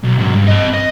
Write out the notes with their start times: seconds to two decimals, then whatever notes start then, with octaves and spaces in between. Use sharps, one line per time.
0.03 B1
0.18 G#2 F#3
0.34 G2
0.47 C4 D#5
0.73 D#5